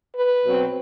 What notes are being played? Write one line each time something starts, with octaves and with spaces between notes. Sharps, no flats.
B4
B2 F#3 C4